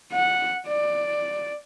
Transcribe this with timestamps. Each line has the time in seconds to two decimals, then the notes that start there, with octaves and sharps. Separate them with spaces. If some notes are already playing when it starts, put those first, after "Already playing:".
0.13 F#5
0.67 D5